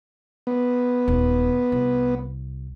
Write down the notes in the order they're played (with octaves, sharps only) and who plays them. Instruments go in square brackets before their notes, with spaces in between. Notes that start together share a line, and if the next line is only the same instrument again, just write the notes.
[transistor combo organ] B3
[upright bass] D#1
C2